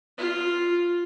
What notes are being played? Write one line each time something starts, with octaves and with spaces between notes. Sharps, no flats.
F4